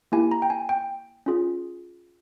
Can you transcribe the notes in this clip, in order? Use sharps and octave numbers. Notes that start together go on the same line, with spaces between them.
A#3 E4 G4 G#5
A#5
G5
G#5
G5
C#4 F4 G#4